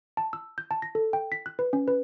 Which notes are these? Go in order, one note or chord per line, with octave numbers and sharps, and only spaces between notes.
A5
E6
G6
A5
A#6
A4
G5
B6
F#6
B4
C#4
B4